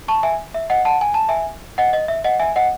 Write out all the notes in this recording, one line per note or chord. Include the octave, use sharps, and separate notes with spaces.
A5 C#6
E5 G#5
E5
D#5 F#5
F#5 A5
G#5
A5
E5 G#5
D#5 F#5
D#5
E5
D#5 F#5
E5 G#5
D#5 F#5